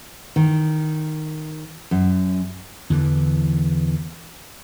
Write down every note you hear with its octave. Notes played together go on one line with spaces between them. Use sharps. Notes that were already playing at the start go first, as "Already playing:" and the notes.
D#3
F#2
E2 D3 E3